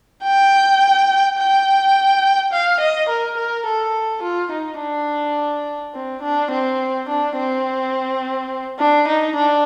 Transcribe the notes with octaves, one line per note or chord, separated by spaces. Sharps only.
G5
G5
F5
D#5
A#4
A#4
A4
F4
D#4
D4
C4
D4
C4
D4
C4
D4
D#4
D4